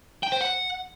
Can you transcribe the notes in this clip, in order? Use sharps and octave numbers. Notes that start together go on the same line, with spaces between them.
G5
C5
F#5